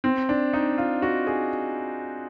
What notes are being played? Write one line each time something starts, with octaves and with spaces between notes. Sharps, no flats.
C4
D4
D#4
F4
F#4
G#4